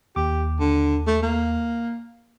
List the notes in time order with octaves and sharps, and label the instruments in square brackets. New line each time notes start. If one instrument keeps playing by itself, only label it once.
[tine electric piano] D#2 D6 [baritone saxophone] G4
[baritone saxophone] D3
A3
A#3